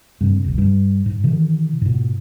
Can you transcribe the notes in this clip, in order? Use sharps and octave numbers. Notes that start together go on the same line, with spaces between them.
G2 C3
D#1 C2
G2
G#2
C3 D#3 E3
G#2 B2